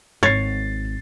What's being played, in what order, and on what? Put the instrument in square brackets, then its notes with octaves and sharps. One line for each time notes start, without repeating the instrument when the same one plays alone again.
[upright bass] G#1 [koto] C#5 [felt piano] A6 C7